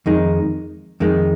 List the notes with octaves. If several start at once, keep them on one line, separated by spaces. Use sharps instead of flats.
F2 D#3 G#3 D#4
F2 D#3 G#3 D#4